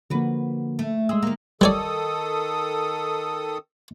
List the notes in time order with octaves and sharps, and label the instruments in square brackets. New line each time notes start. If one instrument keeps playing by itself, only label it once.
[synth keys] D3 F3 A#3 [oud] F#4 B4
[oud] A3
[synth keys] G#3 C6 E6 [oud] G#4
[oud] D#3 A#3
[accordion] D#3 A4 D#6 [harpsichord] G3 C#5 D5